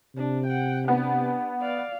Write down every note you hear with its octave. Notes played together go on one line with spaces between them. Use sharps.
C3 D4
F#5 G5
B3 D4 G4
D5 F5